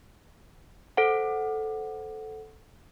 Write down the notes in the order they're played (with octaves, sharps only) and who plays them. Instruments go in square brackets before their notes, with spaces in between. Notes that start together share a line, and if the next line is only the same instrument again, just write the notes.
[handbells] A4 C5 F#5